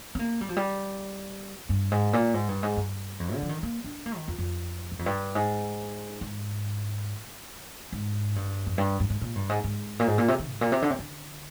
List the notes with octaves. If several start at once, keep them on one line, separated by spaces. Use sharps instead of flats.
C4
A#3
G3
F3
G3
G2
G#2
A#2
G#2
G2
G#2
G2
F2
D3
F3
D#3
A#3
D4
A#3
D#3
F2
F2
G2
F2
G2
G#2
G#2
G#2
G2
F2
G2
G2
G#2
A#2
G2
G#2
G#2
A#2
G#2
A#2
C3
D#3
G#2
A#2
C3
D3
C3
D3